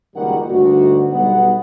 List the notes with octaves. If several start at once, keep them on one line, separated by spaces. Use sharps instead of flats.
F#1 C#2 D#3 G3 A#3 F#5
D2 G2 D3 D#4 F#4
B1 G3 B3 D#4 F#5